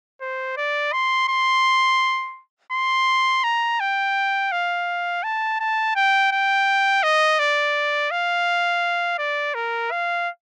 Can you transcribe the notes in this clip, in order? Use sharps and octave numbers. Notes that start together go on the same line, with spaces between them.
C5
D5
C6
C6
C6
A#5
G5
F5
A5
A5
G5
G5
D#5
D5
F5
D5
A#4
F5